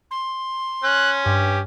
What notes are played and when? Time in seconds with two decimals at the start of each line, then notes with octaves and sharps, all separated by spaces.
0.11 C6
0.84 C#4 F#6
1.26 G2 G4